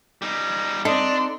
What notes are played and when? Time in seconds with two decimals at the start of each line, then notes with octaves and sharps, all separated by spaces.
0.22 G3 D#4
0.85 C4 D4 D#4 A4 D5 C6